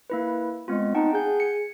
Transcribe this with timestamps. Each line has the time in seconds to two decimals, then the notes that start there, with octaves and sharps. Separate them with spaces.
0.10 A#3 E4 B4
0.68 G#3 B3 C4 F4
0.95 D#4 F#5 G5 A5
1.14 G#4 F#5 G6
1.40 G#5 C#7